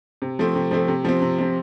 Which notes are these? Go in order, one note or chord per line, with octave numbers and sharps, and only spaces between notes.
C3
F3 A3 C4
C3
F3 A3 C4
C3
F3 C4
C3
F3 C4